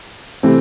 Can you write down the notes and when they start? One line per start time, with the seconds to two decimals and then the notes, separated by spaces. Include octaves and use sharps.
0.43 C3 E3 A3 C4